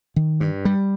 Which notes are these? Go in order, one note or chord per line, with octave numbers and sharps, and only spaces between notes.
D#3
G2
G3